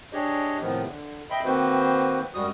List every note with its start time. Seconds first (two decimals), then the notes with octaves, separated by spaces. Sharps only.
0.13 D4 G4 G#4 C#5 D#5
0.61 A2 C3 D#3 F3 B3
0.87 D3
1.30 D#5 E5 G5 B5 C6
1.45 D#3 A#3 C4 F#4 B4 C5
2.34 F#2 G3 G#3 F#4 D#6